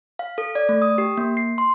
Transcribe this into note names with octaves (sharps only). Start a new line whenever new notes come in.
F5
A4
D5
A3
D#6
G4
A#3
C7
C6